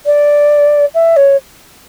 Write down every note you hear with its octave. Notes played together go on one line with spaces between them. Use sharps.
D5
E5
C#5